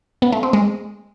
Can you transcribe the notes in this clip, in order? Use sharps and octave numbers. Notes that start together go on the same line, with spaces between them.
B3
A3
C4
G#3